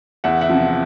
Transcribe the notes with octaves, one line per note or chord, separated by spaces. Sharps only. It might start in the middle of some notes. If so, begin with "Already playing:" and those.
E2 E5 F#5
E5 F#5
C3 F3